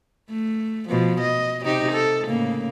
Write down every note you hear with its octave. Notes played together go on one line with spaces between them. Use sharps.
A3
B2 F3
D#5
C3 D#4 G4
A4
A2 C#3 A#3